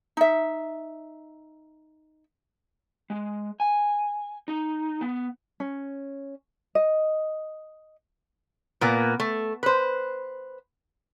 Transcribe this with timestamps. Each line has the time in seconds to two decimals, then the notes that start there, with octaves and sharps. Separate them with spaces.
0.17 D#4 E5
3.10 G#3
3.60 G#5
4.48 D#4
5.01 B3
5.60 C#4
6.75 D#5
8.81 A#2 A#3 B3
9.20 A3
9.63 B4 C5